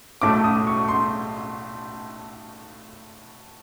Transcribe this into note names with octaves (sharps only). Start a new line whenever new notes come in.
B1 A2 F#3 A3 D6
D#6
C#6
C6